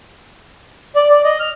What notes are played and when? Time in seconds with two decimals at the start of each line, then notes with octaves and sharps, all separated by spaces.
0.96 D5
1.10 D5
1.24 D#5
1.40 F6